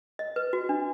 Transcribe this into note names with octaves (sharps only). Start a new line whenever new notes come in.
D#5
B4
F#4
D4